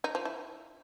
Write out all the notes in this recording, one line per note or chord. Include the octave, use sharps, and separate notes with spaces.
D#4
F3
E4